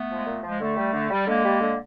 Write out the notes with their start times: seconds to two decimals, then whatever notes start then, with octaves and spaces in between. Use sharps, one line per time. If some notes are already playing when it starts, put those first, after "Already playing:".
Already playing: A3 B3
0.10 F3
0.15 G#3
0.27 A#2
0.43 F3 G#3
0.60 D3 A3
0.77 G3
0.93 D3
1.10 G3
1.27 D3 G#3 A#3
1.44 G3
1.61 D3